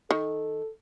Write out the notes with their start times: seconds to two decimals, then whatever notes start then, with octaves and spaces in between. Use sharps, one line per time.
0.11 D#3 A4